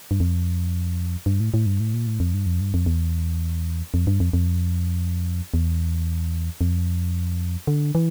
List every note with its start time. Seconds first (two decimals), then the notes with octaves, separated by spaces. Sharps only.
0.11 G2
0.20 F2
1.26 G2
1.40 A2
1.54 A2
1.66 G2
1.80 A2
1.94 A#2
2.07 A2
2.20 F2
2.34 G2
2.46 F2
2.61 G2
2.74 F2
2.86 E2
3.94 F2
4.07 G2
4.20 F2
4.33 F2
5.54 E2
6.61 F2
7.67 D3
7.95 E3